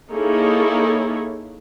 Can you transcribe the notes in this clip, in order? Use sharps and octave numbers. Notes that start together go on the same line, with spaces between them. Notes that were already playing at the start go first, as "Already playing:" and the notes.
A#3 D#4 E4 G#4 A4 C#5